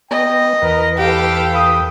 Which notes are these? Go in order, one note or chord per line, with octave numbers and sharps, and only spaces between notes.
B3 D#5 G5
E2 A#4 B4
G4 A4 F5 G5
D#6